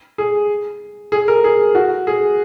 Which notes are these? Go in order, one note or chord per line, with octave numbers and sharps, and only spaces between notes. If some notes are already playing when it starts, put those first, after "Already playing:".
G#4
G#4
A#4
G#4
F#4
G#4